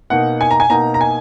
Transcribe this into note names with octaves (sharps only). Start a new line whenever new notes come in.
B2 A#3 D#4 F#5
G#5
A#5
G#5
B2 A#3 D#4 A#5
A#5
G#5